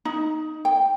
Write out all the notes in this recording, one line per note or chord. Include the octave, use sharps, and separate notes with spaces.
D#4
G5